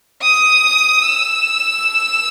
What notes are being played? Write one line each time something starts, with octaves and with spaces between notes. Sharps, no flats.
D#6
E6